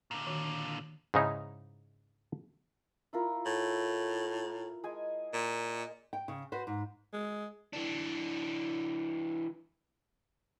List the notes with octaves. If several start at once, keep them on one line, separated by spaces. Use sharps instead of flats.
A#2 D3
D#3 F#4
G#2 C#3 D#4 E4
E4 F4 A#4
A2
G#3 G#5
A#2
G5
C#3
F#4 B4 C5
G#2
G#3
E3 D4